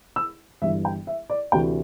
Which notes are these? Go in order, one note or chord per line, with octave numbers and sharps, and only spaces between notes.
E6
G1 G2 E3 E5
G5
E5
D5
D2 C3 E3 G5